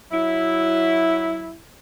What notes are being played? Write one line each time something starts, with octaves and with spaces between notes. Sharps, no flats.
F#3 E4